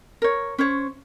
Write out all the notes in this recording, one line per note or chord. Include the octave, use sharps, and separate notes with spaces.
A#4 C#5
C#4 C5 C#5